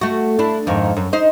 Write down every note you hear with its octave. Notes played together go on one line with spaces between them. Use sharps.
A3 F#4
D4 E4
F2 G#2 D#3
F#2
D#4 C5